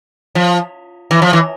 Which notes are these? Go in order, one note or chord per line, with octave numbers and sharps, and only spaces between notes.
F3
E3
F3
E3